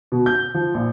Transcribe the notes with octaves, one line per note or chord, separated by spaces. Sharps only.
B2
G6
F3
A#1